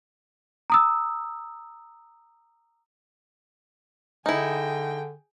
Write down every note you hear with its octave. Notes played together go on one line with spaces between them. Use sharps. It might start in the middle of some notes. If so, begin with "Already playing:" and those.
A#5 D#6 E6
D3 D#4 E4 G#4 G5